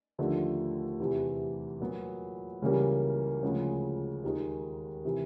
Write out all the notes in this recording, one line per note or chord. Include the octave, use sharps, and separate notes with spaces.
D#2 D3 F3 A3 D4
E2 C3 E3
A#2 F#3 B3
C#2 C#3 E3 G3 A#3
D2 C#3 F3 G#3
D#2 D#3 G#3
C3 E3